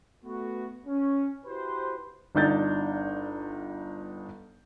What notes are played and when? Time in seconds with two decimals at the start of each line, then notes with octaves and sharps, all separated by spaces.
0.24 A3 B3 F#4
0.87 C#4
1.45 E4 F#4 G4 B4 C5
2.35 G1 D4 D#4 G6 A6